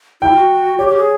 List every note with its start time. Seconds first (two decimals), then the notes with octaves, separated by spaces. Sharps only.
0.21 E4 G5
0.31 F4
0.36 F#4
0.78 G4 C#5
0.88 G4
0.97 G#4